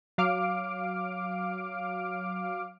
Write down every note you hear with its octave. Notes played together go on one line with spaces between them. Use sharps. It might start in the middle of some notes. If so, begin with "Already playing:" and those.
F#3 F5 D6 F6 D7